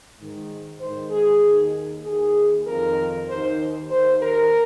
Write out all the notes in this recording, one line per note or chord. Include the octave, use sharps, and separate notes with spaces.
G#2 D#3
G#2 D#3 C5
G#4
D#2 D#3
D#2 D#3 G#4
F2 D#3 A#4
D#2 D#3 C5
D#2 C5
D#3
A#4